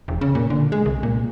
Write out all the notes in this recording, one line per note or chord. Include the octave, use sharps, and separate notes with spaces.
E1
C#3
A#2
D3
G#3
C2
A#2